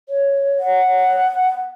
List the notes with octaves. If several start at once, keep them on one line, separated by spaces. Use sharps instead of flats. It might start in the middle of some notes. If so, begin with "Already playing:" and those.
C#5
F#5